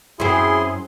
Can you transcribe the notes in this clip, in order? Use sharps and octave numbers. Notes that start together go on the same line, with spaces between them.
F#2 C4 E4 G#4 C6